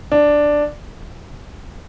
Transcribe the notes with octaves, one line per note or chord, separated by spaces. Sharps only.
D4